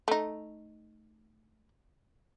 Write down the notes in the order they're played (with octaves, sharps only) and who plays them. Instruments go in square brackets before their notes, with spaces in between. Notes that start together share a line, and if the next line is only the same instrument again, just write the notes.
[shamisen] A3 D#4